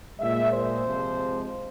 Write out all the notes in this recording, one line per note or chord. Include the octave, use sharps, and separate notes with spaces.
A#2 G#3 E5
C5
C3 F3 G#3